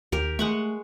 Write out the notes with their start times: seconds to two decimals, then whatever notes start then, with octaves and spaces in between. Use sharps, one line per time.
0.12 D#2 G4 A#4
0.39 G#3 A3 F#5 C#6